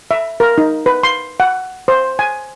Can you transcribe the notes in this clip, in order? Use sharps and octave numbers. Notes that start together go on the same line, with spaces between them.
E5
A#4
D#4
B4
C6
F#5
C5
G#5